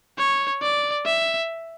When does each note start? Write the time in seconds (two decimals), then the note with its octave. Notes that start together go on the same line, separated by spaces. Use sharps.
0.18 C#5
0.62 D5
1.06 E5